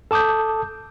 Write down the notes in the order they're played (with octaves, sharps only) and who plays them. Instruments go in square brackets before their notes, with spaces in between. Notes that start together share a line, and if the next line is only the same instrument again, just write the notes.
[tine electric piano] A4 A5 D6 D#6 G6